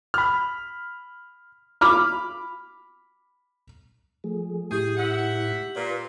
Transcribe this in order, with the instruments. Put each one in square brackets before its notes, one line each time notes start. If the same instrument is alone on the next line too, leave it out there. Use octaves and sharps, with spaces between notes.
[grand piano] B5 F6
[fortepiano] B5 D6 F6
[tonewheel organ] F3 A3 G#4
[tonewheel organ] A2 E4 [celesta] G4 G6 [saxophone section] G#4
[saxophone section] G#2 E5 F#5
[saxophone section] A#2 [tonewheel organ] B4